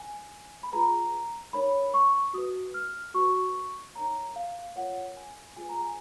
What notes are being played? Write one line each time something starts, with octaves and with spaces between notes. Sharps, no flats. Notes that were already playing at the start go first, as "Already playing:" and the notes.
Already playing: G#5
B5
F4 G#4 B4 A#5
D#4 A#4 C#5 B5
C#6
F#4 B4 D#6
F6
F#4 B4 C#6
D#4 A#4 C#5 A#5
F5
F4 A#4 C#5 F#5
G#5
F4 G#4 B4 G#5
A#5
G#5